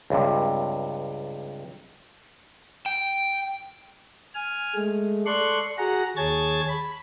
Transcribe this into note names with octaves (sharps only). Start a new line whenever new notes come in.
C#2 G2 C3
G5
G#5 F6
G#3 A3
A4 D5 C6 C#6 F#6
F#4 G#4 F#5 A#5
D#2 G#4 C#5 A5 G#6 A6
B5